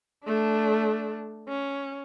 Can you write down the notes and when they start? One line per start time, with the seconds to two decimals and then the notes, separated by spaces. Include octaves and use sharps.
0.25 A3 D4
1.48 C#4